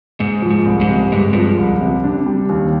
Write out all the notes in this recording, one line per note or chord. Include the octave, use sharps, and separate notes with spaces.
G#2 G#3
F3
G#2
C2
G#2
C3
G2 G#3
G2 F3
C2
C3
D4
G3
D#2